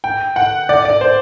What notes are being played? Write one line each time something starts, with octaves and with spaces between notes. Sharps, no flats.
G5
F#5
D5
D5
C5